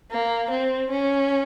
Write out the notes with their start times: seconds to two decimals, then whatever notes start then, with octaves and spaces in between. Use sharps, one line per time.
0.11 A#3
0.51 C4
0.90 C#4